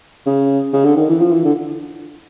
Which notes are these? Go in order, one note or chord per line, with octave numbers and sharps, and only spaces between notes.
C#3
C#3
D3
D#3
E3
F3
E3
D3